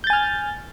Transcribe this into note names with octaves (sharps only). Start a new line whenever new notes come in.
G#5 F6 G6 A6